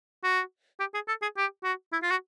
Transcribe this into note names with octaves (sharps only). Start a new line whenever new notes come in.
F#4
G4
G#4
A4
G#4
G4
F#4
E4
F4
F#4